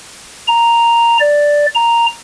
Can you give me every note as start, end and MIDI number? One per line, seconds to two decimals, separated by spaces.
0.47 1.17 82
1.20 1.66 74
1.75 2.06 82